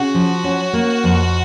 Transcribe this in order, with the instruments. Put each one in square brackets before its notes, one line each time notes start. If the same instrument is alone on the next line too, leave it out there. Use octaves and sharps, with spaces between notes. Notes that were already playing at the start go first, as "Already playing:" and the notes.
Already playing: [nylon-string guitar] C#3 [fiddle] F#4
[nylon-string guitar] F3
C#4
A#3
F2